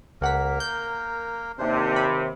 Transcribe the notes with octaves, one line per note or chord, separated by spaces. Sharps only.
C#2 A#3 A#4 F#5 B6
G6
D#2 C3 D4 C5
B5